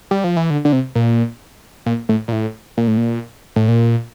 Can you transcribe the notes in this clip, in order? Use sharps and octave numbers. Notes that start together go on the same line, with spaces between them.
G3
F3
E3
D3
D3
C3
A#2
A#2
A2
A#2
A2
A#2
A2
A#2
A2
A#2